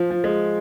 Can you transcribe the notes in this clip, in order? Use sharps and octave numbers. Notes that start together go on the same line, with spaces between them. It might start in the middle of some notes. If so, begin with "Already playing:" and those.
Already playing: F3
F3
G#3